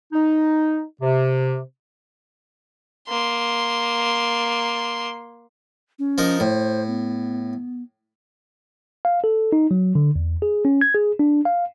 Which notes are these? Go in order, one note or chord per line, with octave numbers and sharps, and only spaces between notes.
D#4
C3
A#3 C6
C#4
F3 D#4 A#4
A2 C5
B3
F5
A4
D#4
F#3
D3
E2
G#4
C#4
G#6
G#4
D4
F5